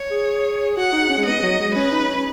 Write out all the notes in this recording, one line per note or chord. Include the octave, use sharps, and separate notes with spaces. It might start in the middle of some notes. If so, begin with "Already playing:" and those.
Already playing: C#5
G#4
F#4 F#5
D#4
C#4
G#3
B3 D#5
F#3
G#3
C#4 B4
D#4
C#4